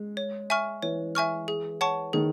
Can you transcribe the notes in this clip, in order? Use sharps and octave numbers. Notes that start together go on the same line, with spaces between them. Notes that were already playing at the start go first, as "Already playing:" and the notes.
Already playing: G#3
C#5
E5 G#5 C#6 F6
E3 C#5
E5 G#5 C#6 F6
G#4
C#5 F#5 A5 C#6
D#3 G#4